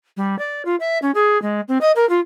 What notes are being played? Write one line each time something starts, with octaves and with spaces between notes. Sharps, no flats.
G3
D5
F4
E5
C#4
G#4
G#3
C4
D#5
A#4
F4